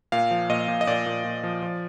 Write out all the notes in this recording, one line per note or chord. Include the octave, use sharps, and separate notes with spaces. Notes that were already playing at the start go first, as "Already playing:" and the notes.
A#2 F5
F3
A#2 D#5
A#2
D#5
A#2 D5
A#2
A#2
F3
F3